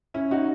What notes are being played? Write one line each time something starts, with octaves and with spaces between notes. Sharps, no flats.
C#4 E4
D#4 F#4